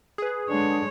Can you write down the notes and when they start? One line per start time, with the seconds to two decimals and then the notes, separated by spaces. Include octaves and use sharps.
0.18 G#4 B4
0.49 D3 G#3 D4 C#5